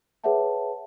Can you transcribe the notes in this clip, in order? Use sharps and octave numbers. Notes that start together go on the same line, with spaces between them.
G#4 B4 C#5 E5 F#5 A5